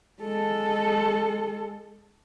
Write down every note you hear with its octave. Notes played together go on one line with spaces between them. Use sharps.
G#3 A4